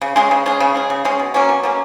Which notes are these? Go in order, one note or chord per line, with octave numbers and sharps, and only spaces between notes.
C#3
G#3 C#4 G#4
C#3
G#3 C#4 G#4
C#3
G#3 C#4 G#4
C#3
G#3 C#4 G#4
B2
F#3 A#3 C#4
B2
F#3 A#3 C#4